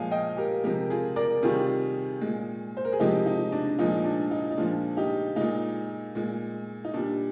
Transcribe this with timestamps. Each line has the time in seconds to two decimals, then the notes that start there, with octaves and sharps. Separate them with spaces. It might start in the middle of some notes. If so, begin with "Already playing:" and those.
Already playing: A#2 F3 G#3 F5 G#5
0.11 D#5 G5
0.37 G4 A#4
0.64 C3 F3 G#3 G4 A#4
0.90 F4 G#4
1.16 A#4 D5
1.42 C3 D#3 G3 F4 G#4
2.21 A#2 G#3
2.77 C5
2.85 A#4
2.92 G#4
3.00 C3 F3 G#3 D#4 G4
3.26 D#4
3.52 D4
3.79 A#2 F3 G#3 D#4
4.04 D4
4.31 D#4
4.51 D#4
4.57 A#2 F3 G#3 D4 F4
4.97 D#4 G4
5.36 A#2 G#3 D#4
6.15 A#2 G#3
6.84 D#4
6.94 A#2 G3 D4